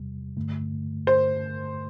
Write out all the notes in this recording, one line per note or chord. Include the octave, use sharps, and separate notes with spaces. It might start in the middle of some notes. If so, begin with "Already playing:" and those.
Already playing: E2 C3 G3
G2 D3 A3
C5